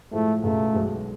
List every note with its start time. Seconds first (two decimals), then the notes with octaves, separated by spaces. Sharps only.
0.12 A2 F3 G#3 A3
0.43 C#2 B2 G#3 A3
0.74 B1 B2 G#3